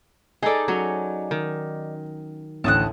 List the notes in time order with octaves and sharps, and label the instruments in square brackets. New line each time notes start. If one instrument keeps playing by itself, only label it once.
[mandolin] D#4 D5 [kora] G#4 A4 [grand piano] G#5
[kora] F#3 C#4
D#3
[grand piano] A1 D2 [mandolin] A5 D#6 F#6